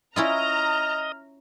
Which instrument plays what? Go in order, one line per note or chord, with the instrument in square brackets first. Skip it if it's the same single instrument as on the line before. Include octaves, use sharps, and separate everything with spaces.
[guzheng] C#4 E4 F4 [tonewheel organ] D#5 [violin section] A#5 [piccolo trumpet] F6